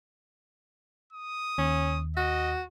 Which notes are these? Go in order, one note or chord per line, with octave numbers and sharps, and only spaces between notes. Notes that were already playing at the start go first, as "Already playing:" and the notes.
D#6
D#2 C#4
F#4 D#5